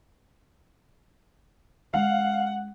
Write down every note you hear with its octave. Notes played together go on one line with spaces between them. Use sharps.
G#3 C#4 F5 F#5